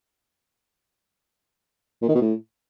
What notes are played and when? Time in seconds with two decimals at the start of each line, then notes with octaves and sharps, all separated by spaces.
2.02 A#2
2.08 D#3
2.15 B2
2.21 A2